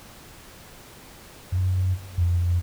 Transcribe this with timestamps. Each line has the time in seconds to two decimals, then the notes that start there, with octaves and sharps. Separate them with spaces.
1.52 F#2
2.18 F2